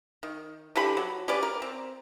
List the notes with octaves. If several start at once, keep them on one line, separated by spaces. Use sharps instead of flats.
D#3
D3 E3 G4 B5
F#3
C#4 G4 B4 D5
A#4
C4